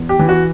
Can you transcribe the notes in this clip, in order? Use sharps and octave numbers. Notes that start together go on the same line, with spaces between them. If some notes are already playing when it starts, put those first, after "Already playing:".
Already playing: E2
G4
E3
F#4